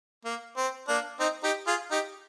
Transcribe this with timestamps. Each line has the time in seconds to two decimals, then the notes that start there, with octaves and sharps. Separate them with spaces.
0.25 A#3
0.57 C4
0.88 A#3 D4
1.20 C4 D#4
1.43 D#4 G4
1.67 F4 G#4
1.91 D#4 G4